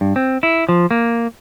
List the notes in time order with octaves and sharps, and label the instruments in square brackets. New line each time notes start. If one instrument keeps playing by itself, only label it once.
[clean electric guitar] G2
C4
E4
F3
A#3